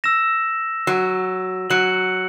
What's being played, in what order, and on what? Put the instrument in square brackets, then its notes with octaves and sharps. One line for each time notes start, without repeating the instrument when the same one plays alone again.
[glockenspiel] E6 A#6 E7
[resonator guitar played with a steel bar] F#3
[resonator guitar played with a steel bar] F#3 [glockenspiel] F#6 C#7 F#7